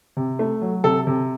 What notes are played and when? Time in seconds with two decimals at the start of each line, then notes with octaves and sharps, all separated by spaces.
0.17 C3
0.39 A3
0.62 F#3
0.84 C3 A4
1.07 C3